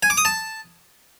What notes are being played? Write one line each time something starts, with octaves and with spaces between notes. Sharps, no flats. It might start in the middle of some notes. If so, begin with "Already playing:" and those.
G#5
D6
D#6
A5